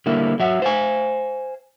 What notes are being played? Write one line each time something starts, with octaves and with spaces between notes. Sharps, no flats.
D3 G3 A#3 E4
F#3 E5 F#5
C5 F5 G#5